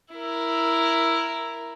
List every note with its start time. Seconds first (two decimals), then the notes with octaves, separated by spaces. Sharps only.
0.13 E4 A#4